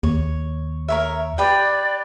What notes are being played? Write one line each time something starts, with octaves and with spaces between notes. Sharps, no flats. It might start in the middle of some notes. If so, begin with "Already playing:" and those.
D#2 C#5
A#4 C#5 E5
G4 B4 D5 G5